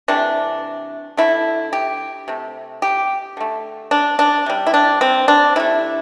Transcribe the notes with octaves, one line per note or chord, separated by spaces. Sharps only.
C3 E3 A3 D4
D3 A3 E4
G4
C3 A3
G4
D3 A3
D4
D4
C3 G3
E4
D4
C4
D4
C3 A3 E4